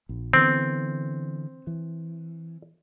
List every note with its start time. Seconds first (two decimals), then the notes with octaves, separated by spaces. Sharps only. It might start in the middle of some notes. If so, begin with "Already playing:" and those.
0.09 A#1
0.33 D3 E3 B3 C4
1.67 E3